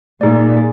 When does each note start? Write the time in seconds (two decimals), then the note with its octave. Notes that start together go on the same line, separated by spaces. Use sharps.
0.21 A#2 D#4 G#4 D5
0.57 G#4